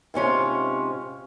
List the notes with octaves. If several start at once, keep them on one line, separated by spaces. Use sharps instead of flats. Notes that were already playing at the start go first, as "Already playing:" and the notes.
G#2 C3 C#4 F4